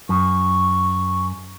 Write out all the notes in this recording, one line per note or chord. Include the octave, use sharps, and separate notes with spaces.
F#2 C#6